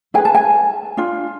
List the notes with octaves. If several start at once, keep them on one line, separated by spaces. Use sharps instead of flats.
E4 G#4 B4 G#5
A5
G#5
D4 F4